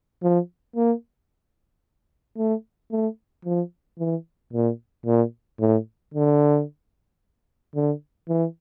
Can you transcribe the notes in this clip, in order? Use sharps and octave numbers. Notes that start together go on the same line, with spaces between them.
F3
A#3
A3
A3
F3
E3
A#2
A#2
A2
D3
D3
E3